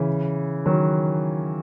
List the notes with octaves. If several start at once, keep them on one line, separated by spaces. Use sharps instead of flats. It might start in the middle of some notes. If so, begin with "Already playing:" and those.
Already playing: C#3 E3
D#3 F#3